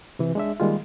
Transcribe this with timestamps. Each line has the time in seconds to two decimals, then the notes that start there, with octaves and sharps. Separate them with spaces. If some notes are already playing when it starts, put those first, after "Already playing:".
0.19 C3 E3
0.35 G#3 D4 E5
0.60 D#3 G3 G#3 A#3 F4